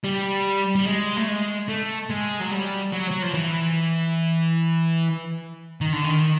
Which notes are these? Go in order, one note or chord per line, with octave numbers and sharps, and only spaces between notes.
G3
G3
G#3
A3
G#3
A3
G#3
F#3
G3
F#3
F#3
F3
E3
D#3
D3
D#3